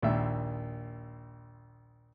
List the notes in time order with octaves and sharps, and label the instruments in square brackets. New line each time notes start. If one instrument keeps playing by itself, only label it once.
[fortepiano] A#1 D#2 E5